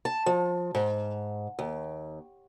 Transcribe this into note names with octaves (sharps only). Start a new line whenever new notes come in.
A5
F3
G#2
D#2